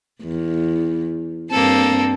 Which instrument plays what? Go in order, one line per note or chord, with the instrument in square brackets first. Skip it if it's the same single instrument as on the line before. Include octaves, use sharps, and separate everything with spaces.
[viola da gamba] E2
[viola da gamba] G2 C4 [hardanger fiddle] A#3 A4